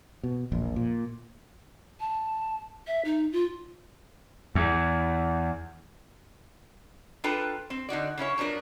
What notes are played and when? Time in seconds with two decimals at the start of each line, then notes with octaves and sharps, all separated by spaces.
0.23 B2
0.52 E1 A#1
0.76 A#2
2.00 A5
2.87 E5
3.05 D#4
3.32 F4
4.55 E2
7.24 D4 F4 A4 B4 G5 A#5
7.70 C4
7.89 D3 D#4 F#4 D5
8.18 C#3 C#4 E4 C#5
8.38 F3 F#3 B3 D4 A#4